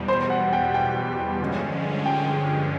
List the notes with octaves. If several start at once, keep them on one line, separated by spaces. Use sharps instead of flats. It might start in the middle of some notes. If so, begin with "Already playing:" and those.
Already playing: E2 B2 G3
C5
F#5
G5
G5
G2 D3 F3 G#3 C#4
G5